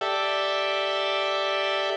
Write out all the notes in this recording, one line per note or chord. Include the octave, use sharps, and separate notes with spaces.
G4 A4 D5 E5